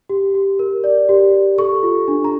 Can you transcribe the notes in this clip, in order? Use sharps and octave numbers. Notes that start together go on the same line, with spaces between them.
G4
G4
A#4
D5
G4
G4
A4 C#6
F4
D4
A#5